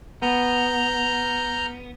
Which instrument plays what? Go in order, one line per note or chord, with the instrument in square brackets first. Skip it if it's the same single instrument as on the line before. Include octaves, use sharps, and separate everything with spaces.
[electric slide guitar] B3 [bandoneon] A#5 F6 G6